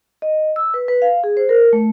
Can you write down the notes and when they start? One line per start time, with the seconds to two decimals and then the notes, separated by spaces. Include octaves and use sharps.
0.22 D#5
0.56 E6
0.74 B4
0.88 B4
1.02 F5
1.24 G#4
1.37 C5
1.49 A#4
1.73 A3